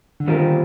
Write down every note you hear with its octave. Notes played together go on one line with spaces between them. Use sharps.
D3
A#2 D#3 G3 C4 F4 A#4